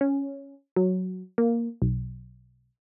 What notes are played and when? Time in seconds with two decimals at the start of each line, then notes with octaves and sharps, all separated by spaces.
0.01 C#4
0.76 F#3
1.38 A#3
1.82 B1